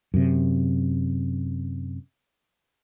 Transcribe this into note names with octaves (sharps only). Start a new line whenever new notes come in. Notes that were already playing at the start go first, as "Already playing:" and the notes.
F#2 C3